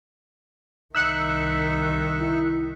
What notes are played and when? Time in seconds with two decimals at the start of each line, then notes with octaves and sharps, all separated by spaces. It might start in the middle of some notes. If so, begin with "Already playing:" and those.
0.95 C2 D#3 D#4 E5 E6 F#6 C#7
2.20 E4